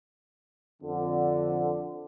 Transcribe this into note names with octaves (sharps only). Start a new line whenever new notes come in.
F2 D3